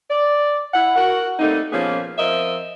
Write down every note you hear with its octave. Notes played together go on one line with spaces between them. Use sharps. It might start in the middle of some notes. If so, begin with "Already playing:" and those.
D5
E4 F#5
F#4 A#4 F#5
G3 A3 A#3 C4 D#4
A#2 F3 A#3 B3 C#4 G#4
F3 C4 A#4 D#5 E5